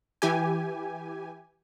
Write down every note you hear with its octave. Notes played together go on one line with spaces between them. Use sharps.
E3 G4 G#5